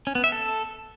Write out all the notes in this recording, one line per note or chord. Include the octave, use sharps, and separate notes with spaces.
C#4
B3
E5
A4